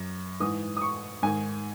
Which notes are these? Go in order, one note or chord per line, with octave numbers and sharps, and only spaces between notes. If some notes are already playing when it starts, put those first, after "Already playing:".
Already playing: F#2
G#2 E3 D#6
D#6
C#6
G#2 D#3 G#5